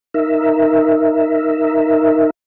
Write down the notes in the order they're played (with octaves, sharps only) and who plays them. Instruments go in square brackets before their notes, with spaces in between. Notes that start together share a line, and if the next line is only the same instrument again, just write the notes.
[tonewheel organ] D#4 A#4 E5